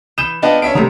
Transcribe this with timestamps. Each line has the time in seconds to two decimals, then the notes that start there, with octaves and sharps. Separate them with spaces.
0.18 E3 D#6 G6 E7
0.42 B3 D4 F4 D#5 G5
0.62 B3 C#4 E5 D7
0.75 C3 D#3 G3 A3 B3 A#5 D#6